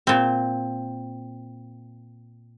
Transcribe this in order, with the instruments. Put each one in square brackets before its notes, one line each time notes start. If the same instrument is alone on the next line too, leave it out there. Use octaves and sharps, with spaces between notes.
[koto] A#2 C4